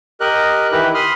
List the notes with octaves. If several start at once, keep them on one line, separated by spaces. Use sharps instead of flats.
G4 A#4 D#5 F#6
D#3 E3 E4 G4 B4
B5 C6 D#6 F6